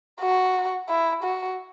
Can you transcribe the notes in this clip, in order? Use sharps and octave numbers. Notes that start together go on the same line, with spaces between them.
F#4
E4
F#4